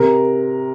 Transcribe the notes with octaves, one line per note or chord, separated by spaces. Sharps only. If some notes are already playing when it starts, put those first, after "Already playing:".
Already playing: C3 A#4